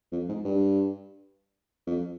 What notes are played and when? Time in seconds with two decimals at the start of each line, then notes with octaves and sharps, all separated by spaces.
0.12 F2
0.29 G#2
0.45 G2
1.87 F2